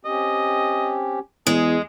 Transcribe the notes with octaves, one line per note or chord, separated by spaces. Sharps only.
C4 C#4 G4 D#5
E2 G#3 G#4